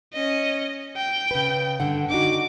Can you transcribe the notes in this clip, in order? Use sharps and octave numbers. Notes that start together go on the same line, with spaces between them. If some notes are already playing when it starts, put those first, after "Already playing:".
C#4 D#5
G5
C#3 B4
G2 D3 F#5
D4 D#4 F#4 D6